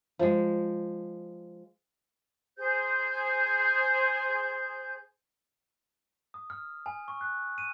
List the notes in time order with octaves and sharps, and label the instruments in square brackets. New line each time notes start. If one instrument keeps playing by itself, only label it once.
[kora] F3 G#3
[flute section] G#4 C5 G6
[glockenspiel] D#6
F6
G#5
C#6
F#6
D#7